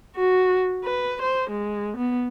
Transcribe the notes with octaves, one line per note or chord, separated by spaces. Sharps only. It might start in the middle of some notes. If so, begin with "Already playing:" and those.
F#4
B4
C5
G#3
B3